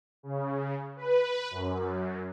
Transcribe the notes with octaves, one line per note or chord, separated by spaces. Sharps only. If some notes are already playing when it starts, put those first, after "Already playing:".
C#3
B4
F#2